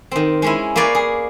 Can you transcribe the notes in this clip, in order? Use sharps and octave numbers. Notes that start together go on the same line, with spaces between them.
D#3 C4
G#3 C#4 E4
A#3 B4 C#5 D5 F5 G#5
G#4